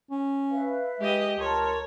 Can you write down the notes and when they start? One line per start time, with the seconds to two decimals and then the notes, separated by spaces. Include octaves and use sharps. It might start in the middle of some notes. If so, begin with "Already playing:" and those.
0.11 C#4
0.51 B4 E5 F5
1.01 G#3 G4 D#5
1.39 C#2 A#4 C#5 A5 C6